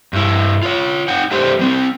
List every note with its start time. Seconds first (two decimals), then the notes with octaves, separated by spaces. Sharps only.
0.13 G2 E4
0.63 F4 C#5
1.08 D#4 F#5 G5
1.31 A3 D4 G4 B4 C5
1.59 G3 C4